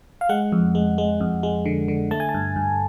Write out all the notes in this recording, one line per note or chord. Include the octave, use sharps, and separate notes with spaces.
F5
G#3 F#5
F2
G#3
G#3
F2
G#3
D3
D3
A3 A5
G#5
A5
G2
G2